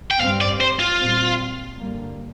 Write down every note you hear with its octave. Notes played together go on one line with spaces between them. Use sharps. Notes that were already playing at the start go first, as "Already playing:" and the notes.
G5
G2 G3 C4 F5
D5
C5
F4
A#2 G3 C4
G2 D3 G3 A#3